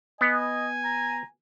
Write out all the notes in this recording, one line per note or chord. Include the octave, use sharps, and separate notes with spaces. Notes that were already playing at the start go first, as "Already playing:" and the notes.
B3 D#5 G#5
A#5